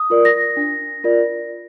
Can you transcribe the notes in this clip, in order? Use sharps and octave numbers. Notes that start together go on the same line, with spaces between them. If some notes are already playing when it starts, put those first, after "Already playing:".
Already playing: D#6
F4 A#4 D5
A#6
D4
F4 A#4 D5